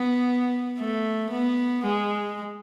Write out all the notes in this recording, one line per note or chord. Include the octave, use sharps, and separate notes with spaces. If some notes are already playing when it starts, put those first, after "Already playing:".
Already playing: B3
A3
B3
G#3